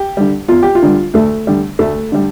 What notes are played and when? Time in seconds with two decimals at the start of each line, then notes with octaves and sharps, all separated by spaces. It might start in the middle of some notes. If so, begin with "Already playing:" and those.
Already playing: G4
0.17 D3 G3
0.48 E2 F4
0.62 G4
0.75 F4
0.82 D3 G3
1.14 D2 A3
1.47 D3 G3
1.79 D2 A3
2.12 D3 G3